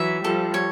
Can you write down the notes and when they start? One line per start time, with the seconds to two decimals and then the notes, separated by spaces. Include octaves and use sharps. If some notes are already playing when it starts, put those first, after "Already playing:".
Already playing: E3 F#3 E5
0.24 F3 G3 A4
0.54 C#5